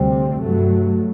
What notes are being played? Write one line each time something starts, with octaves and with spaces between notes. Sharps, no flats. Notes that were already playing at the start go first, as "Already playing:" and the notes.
Already playing: D2 C3 G3 C4
G2 F#3 A3